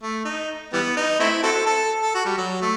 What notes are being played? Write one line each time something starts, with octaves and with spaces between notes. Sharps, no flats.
A3
D#4
E3 G3 B3
D#4
A3 C4 E4
C4 F#4 A4
A4
A4
F#4
G3
F#3
A3